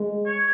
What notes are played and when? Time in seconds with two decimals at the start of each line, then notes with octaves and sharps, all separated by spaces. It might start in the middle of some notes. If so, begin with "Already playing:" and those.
Already playing: G#3
0.26 C#5